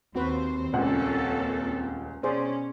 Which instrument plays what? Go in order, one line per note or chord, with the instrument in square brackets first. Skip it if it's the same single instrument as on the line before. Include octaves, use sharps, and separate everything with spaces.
[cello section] D#2 C5 [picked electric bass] C4 [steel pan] F#4 B4
[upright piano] D#1 C#2 F#5 [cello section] A#3 C#4 A4
[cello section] B2 C#4 [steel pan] G#4 C5 D5